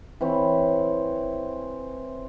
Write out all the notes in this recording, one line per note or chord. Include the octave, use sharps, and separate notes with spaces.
E3 C4 C#5